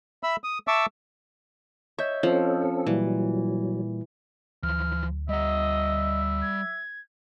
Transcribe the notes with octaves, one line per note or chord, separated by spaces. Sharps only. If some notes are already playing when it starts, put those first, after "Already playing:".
E5 B5 E6
D#6
E5 A5 C#6 D6 E6
C#5 D#5 E5 G6
F3 C4 C#4 A4
A#2 E3 F#3 G3
D2 E3 F3 F6
G3 D#5 E5 F#5
G#6